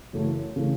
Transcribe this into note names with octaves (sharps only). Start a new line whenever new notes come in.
F#2 C#3 E3 A3
C#3 E3 A3